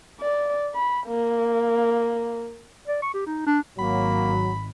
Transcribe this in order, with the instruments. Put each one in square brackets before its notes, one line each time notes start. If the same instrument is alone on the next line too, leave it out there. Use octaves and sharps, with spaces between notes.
[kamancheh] D5
B5
A#3
[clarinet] D5
C#6
G4
D#4
D4
[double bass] G#1 [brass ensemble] F#3 [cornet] A#3 [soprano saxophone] B5